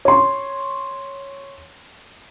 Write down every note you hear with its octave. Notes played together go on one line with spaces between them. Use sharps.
C#5 C6